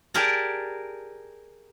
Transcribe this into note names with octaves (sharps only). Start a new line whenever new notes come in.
G4 G#4 A#4 D5 A5 A#5